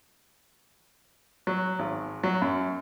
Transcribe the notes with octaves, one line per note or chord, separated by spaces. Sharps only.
F#3
G#1
F#3
F#2